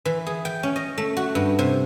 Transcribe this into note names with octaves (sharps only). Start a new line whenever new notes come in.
E3
G#4
G5
C#4
D#5
A3
F#4
G2
C3